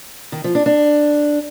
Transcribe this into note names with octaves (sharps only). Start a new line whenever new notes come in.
D#3
F3
D4
D4